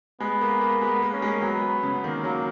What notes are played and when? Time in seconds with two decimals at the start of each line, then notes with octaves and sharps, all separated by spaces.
0.20 G#3 B3
0.41 A#3
0.61 A#3
0.81 G#3 B3
1.02 A#3
1.13 C#4
1.22 G#3
1.42 F#3 B3
1.83 C#3
2.03 D#3 A#3
2.24 F#3